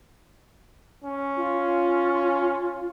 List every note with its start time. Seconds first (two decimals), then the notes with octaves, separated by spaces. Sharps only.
1.04 C#4
1.37 F4